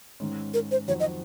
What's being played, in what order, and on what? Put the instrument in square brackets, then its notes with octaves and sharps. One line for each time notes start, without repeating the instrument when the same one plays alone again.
[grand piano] G#2 D#3 G#3 C#4
[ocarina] A#4
C5
[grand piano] F2 D#3 F#3 C4 F#4 [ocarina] C#5
[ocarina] D#5